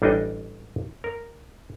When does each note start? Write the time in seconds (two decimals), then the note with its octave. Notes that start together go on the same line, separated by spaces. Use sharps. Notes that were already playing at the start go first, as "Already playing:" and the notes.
0.02 A1 G3 D4 D#4 D#5 G5
1.04 A#4